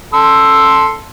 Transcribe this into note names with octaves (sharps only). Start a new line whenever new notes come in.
A4 C6 E6